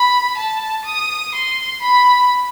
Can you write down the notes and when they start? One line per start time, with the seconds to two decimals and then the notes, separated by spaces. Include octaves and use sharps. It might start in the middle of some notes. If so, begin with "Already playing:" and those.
Already playing: B5
0.37 A5
0.85 D#6
1.35 C6
1.82 B5